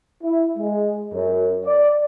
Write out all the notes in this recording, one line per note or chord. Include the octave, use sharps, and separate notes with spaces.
E4
G#3
F#2
D5